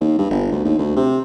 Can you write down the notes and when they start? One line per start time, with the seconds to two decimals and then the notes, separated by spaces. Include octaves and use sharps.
0.01 D#2
0.19 G2
0.31 G1
0.52 D2
0.65 D#2
0.79 D2
0.96 C3